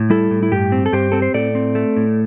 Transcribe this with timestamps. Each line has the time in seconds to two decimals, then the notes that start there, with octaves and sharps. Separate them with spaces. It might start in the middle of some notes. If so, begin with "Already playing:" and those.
Already playing: A2
0.10 G3 E4 A4
0.31 A2
0.43 E4
0.51 G2 G4
0.72 C4
0.86 A4
0.93 G2 G4 C5
1.12 C4 A4
1.22 C5
1.34 A2 A4 D5
1.55 C4
1.75 A3
1.97 A2